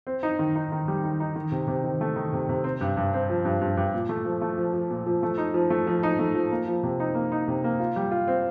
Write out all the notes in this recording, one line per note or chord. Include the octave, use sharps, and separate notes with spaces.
C4
D#4
D#3
D#4
D#3
G3
D#3
D#4
D#3
C3
C3
D#3
A3
D#3
C3
C3
C4
G2
G2
C4
F3
G2
G2
G2
A#2
A3
F3
A3
F3
F3
A#2
F3
A3
D#4
F3
A3
F3
D#4
A3
F3
A#3
F3
C3
D#4
A#3
D#4
C3
A#3
F4
G3
F4
C4